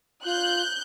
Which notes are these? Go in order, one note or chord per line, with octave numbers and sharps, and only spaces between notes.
F4 F#6 G6